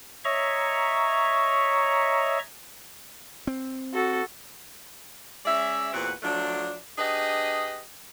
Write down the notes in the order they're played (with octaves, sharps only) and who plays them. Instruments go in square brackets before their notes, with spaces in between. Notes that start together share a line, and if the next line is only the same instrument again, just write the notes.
[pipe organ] C#5 D#5 E5 A#5 C#6
[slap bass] C4
[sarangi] F#4 [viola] A4
[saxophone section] G#3 C#4 D5 E5
E2 A#2 C4 F#4 B4 F#5
F3 F#3 A3 D4
D4 G4 G#4 B4 D#5